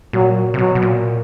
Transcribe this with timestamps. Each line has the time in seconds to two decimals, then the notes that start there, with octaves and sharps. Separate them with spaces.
0.13 A#2 F#3
0.54 C3
0.59 B2 F#3
0.75 B2
0.82 A#2